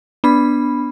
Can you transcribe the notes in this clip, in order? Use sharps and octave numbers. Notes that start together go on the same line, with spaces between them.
B3 D4 B5